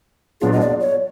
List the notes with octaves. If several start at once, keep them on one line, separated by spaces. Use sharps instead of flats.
A#2 F#3 B3 D4 F4 G#4
D#5
D5
C#5